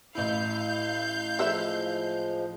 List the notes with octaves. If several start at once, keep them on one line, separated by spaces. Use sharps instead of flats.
A1 E4 F5 G6
F3 G#3 A4 B4 E5